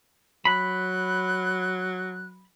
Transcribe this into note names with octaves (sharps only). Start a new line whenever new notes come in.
F#3 B5 F#6